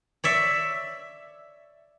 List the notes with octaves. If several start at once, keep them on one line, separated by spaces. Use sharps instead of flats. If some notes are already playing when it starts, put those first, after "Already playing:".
C#5 D5 E5